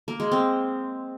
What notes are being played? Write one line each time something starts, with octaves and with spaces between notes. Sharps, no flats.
A#3
G#3
C4